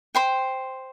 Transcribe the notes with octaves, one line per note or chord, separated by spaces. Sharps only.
C5 G5 C6